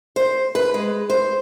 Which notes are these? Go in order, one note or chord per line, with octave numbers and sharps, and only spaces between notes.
C5
B4
G#3
C5